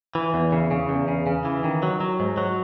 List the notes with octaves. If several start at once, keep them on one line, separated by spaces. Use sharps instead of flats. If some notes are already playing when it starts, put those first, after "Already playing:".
E3
E2
C#3
C#3
E2
C#3
C#3
E3
D#3
F#3
F#3
G#2
F#3